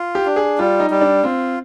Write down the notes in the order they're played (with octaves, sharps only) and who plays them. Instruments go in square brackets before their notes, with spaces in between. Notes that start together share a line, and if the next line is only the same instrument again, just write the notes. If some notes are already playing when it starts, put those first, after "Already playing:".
Already playing: [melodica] F4
[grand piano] G4
[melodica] D4
[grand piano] G#4
[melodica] G3 [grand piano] F4
[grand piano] D#4
[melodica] G3
[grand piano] D4
[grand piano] C4 [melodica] F4